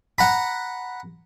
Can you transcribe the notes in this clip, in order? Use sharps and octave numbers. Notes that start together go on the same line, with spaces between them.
F#5 A#5 B5